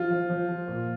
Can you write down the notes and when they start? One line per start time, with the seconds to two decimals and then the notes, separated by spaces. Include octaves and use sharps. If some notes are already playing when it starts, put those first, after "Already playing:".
Already playing: F3 F4
0.10 F3
0.30 F3
0.49 F3
0.68 A#2